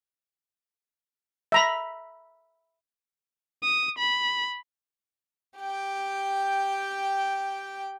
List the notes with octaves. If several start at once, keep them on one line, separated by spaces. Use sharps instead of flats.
E5 A#5 B5
D#6
B5
G4 G5